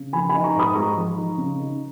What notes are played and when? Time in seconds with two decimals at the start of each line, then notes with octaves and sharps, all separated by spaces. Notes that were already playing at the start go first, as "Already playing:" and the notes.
Already playing: C#3
0.13 F3 G#5 B5
0.29 D#4 G#5 B5
0.44 A#5 C#6
0.55 G#2 B5 D#6
0.75 G#3 A#5 C#6
0.96 F3
1.17 D#4
1.38 C#3
1.59 D#4